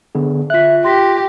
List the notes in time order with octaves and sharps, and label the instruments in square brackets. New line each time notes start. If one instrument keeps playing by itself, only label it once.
[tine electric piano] D3 B3 G#4
[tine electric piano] F4 F#6 [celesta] E5 B6
[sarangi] G4 [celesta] C6 A#6 B6